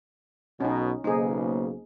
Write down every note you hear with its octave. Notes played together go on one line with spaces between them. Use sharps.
B1 B2 C#4 D#4
B1 C#3 A#3 D#4 G#4 C5